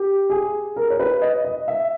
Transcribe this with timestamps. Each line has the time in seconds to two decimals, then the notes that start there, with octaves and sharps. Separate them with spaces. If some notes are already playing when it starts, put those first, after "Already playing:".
Already playing: G4
0.30 G#4
0.76 A#4
0.90 C#5
0.99 B4
1.22 D#5
1.45 D#5
1.68 E5